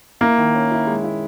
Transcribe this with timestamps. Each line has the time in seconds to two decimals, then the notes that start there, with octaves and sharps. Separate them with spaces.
0.21 A#3 E4
0.38 D#3
0.55 C#4
0.71 E4
0.87 G#3
1.04 E4